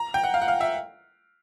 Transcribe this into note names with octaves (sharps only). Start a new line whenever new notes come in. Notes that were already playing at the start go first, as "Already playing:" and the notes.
Already playing: A#5
G5
F#5
F5
F#5
F5
E5